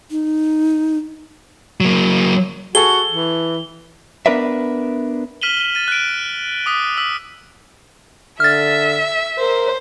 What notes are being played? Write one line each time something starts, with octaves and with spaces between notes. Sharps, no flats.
D#4
F#3 A#3
F#4 G#4 A4 G7
E3
B3 D4 A#4 B4 D5 E5
F6 B6 D#7 E7 F#7 G7
F6 D#7
A6 D#7
F#6 D7
D6 D#6 B6 D7
D#6 E6 B6
D3 E5 F6 A6
A#4 C5